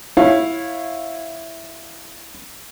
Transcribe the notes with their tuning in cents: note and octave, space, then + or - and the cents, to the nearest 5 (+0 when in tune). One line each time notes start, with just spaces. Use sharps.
E4 +0 C#5 -10 F5 +15